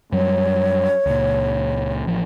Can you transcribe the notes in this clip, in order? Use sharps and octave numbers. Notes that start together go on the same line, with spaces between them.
F#2 F#3 G3 C#5
C#2 A#2
A1 F3